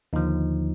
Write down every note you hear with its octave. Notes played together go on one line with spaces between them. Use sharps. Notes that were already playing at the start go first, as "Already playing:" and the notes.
D#2 D3 F3 D#4